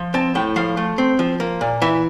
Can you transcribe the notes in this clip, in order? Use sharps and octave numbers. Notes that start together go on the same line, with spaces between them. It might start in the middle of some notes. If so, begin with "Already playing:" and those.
Already playing: F3
C4 A5
A2 G5
F3 F5
A3
C4
F3
A#3
A#2
E3 E5